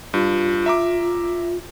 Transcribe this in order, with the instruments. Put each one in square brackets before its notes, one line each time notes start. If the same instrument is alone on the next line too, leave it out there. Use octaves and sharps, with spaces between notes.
[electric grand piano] G2 [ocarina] F4
[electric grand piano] E5 A#5 D6